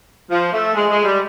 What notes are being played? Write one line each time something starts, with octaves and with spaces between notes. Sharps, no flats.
F3
A3
G#3
G#3
G3